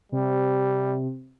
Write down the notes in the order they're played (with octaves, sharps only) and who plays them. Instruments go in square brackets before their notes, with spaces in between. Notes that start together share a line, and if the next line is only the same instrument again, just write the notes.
[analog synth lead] C3 [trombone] G3